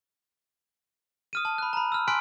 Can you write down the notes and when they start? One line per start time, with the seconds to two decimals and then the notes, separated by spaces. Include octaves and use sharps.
1.33 D#6 F6 D#7
1.45 A5
1.58 B5 F#6
1.73 A#5 B5
1.92 E6 F6
2.08 G#5 C6 F6 F#6 B6 D7